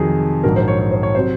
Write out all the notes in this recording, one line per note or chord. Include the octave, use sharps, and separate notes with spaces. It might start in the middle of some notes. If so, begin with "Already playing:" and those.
Already playing: F2 C3 D#3 F#3 G#4
A#1 G#2 F#3 A#4
C5
C#5
C#5
C5
C#5
C3 F#3 C5